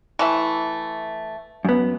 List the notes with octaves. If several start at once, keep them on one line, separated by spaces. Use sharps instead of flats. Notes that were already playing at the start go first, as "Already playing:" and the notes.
E3 A3 E5
F#2 B3